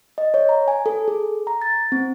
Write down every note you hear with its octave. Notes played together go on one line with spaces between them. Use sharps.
D#5
C#5
A#5
G#5
A4
G#4
A#5
A6
C4